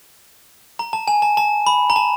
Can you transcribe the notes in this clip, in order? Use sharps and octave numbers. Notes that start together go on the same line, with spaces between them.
A#5
A5
G#5
A5
A5
B5
A#5
A5